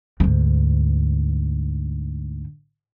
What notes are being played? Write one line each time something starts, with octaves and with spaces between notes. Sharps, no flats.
D2 G#2